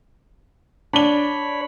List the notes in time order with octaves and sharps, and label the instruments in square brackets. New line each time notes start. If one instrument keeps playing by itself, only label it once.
[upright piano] D4 G7 [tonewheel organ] C#5 B5